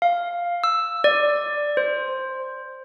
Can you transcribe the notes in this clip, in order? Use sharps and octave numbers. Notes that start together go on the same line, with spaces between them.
F5
E6
D5
C5